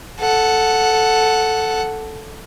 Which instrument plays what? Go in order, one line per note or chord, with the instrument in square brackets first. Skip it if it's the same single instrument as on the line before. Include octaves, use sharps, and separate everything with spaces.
[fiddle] A4 F#5